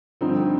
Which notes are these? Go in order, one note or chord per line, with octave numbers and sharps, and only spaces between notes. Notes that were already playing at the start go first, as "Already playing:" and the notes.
G2 D3 F3 C4 D#4